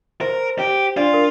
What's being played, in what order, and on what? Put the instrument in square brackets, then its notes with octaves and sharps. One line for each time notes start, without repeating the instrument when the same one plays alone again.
[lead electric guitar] A#4 [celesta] C5
[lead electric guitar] G4
[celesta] D4 D5 [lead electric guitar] F4
[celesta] A#4